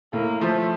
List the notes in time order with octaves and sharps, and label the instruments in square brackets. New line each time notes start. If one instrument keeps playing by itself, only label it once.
[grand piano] A2 [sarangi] A#3
[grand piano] F3 [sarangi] A3